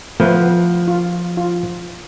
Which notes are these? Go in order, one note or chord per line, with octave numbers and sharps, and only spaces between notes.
F3 A3 B3 B4
F4
F4